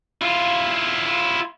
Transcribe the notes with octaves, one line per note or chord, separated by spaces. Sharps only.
E4 F4